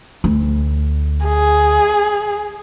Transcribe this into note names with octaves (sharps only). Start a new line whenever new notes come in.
D2
G#4